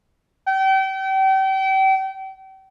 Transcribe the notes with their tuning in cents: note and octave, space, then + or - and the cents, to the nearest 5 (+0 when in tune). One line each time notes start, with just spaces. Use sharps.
G5 -35